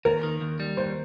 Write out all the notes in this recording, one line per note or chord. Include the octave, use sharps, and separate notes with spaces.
D#2 A#4
D#3
D#2
G3
D#2 C5